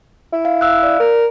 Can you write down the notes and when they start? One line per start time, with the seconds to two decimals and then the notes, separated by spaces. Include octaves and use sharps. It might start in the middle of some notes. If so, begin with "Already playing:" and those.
0.33 E4
0.45 F5
0.61 F5 E6 F#6
0.83 D5
0.99 A#4